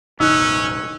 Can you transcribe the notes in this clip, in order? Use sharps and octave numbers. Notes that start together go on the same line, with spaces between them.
E1 A1 C#3 C#4 D#4 E6 F#6